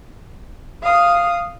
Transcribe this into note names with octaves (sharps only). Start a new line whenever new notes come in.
F5 D#6